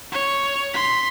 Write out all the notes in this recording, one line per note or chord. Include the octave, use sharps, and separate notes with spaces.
C#5
C6 B6